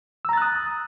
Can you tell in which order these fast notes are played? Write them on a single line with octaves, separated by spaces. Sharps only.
E6 A#5 A6 F#6 D#6